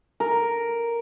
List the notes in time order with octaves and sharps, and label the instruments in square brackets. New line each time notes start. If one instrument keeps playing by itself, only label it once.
[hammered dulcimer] A#4